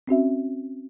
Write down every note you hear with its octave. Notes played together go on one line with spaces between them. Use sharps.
C4 C#4 F#4 E5